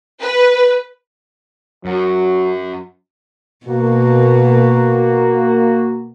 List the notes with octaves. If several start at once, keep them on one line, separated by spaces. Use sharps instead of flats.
B4
F#2 F#3
B2 A#3 F#4